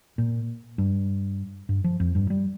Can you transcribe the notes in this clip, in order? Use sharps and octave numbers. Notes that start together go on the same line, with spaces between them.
A#2
G2
G2
F3
F2
G2
G3